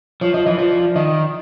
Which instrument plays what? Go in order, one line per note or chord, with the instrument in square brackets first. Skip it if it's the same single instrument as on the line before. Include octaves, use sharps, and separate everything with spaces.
[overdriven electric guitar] F3 [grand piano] C#5
[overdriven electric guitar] F3 [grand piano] D#5
[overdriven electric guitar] E3 [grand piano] D#5
[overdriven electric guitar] F3 [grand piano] D5
[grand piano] D5
[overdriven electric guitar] D#3 [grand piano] D#5